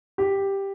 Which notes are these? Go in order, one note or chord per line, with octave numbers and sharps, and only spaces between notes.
G4